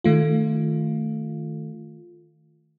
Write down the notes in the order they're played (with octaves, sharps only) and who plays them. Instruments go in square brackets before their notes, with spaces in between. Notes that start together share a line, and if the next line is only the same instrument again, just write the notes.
[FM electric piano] D#3 A3 F4